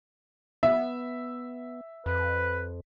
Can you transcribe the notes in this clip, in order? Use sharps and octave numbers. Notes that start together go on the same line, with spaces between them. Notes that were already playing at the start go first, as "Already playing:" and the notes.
B3 E5
F2 B4